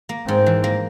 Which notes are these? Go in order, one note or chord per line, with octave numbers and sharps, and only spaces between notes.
A#3
G#2 C4
E3
A#3